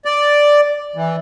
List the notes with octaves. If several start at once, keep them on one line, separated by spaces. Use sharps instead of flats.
D5
E3